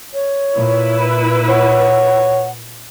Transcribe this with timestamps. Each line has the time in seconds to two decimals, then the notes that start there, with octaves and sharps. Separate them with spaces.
0.14 C#5
0.56 A#2 E4 B4
1.49 C#5 F#5